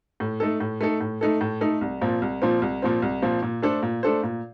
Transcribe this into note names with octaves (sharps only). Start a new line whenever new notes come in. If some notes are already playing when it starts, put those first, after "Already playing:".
A2
A3 D#4 A4
A2
A3 D#4 A4
A2
A3 D#4 A4
A2
A3 D#4 A4
C2
A#2 F3 C4
C2
A#2 F3 C4
C2
A#2 F3 C4
C2
A#2 F3 C4
A#2
A3 D4 A4 C5
A#2
A3 D4 A4 C5
A#2